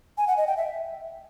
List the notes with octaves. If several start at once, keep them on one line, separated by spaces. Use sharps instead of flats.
G#5
F#5
D#5
G5
E5